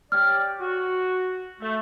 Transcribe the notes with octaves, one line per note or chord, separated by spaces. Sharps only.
G4 C#5 D5 F6
F#4
A3